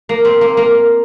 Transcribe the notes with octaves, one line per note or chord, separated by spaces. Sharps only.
A#3
C4
A#3
A#3